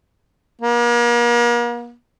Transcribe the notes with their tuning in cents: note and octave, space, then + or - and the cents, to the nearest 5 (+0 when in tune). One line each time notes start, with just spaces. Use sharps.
A#3 +40